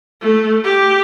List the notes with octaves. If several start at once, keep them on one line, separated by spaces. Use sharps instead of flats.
A3
G4